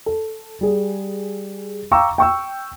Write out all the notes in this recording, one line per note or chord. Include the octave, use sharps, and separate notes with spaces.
A4
G3 G#4
F5 G5 A#5 C#6 D6 E6
G5 C#6 E6